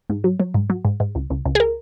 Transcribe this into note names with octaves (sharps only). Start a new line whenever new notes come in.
G#2
F#3
F#3
G#2
F#3
G#2
G#2
C#2
C#2
C#2
G#4
A#4